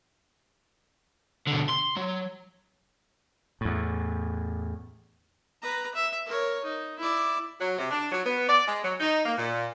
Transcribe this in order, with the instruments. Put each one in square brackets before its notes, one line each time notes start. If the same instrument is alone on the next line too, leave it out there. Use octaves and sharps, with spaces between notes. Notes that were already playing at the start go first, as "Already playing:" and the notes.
[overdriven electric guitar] B2 D3
C6
F#3
[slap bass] E2 A2
[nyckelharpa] B4 A#5
E5
A#4 C#5
D#4
E4 D5
[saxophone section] F#3
C3
D4
F#3
B3
D5
G#3
F#3
D#4
A#3
A#2